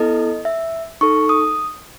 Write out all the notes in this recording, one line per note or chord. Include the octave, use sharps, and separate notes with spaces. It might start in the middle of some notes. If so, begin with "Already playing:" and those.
Already playing: B3 E4 A4 D#5
E5
D#4 A4 C#6
D#6